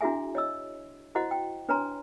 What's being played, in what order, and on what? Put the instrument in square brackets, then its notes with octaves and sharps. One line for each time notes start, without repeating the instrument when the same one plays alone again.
[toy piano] D4 E4 F#4 G#4 E5 G#5
C#5 D#5 E6
E4 F#4 C5 D#5 F#5
G5
D4 B4 C#5 G#5 A#5 C6